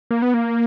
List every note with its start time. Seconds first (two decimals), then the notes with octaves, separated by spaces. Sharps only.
0.11 A#3
0.22 B3
0.34 A#3